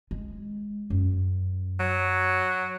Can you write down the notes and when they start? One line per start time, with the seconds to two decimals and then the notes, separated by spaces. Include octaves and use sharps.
0.11 G#3
0.90 F#2
1.80 F#3